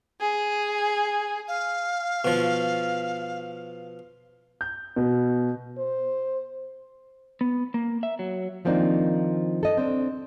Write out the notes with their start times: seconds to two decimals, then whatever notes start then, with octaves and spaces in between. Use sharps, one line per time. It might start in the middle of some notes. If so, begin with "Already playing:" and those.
0.21 G#4
1.48 F5
2.25 B2 F3
4.61 G6
4.96 B2
5.78 C5
7.41 B3
7.74 A#3
8.03 E5
8.19 F#3
8.65 D#3 F3 A#3 C4 D4 D#4
9.63 A4 D#5
9.77 C4 D4